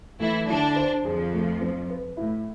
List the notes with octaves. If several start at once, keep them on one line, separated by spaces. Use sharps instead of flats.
E3 A3 E4
D3 D4 E4
C5
F2 F3 G#4
A3
C4
B4
A2 E4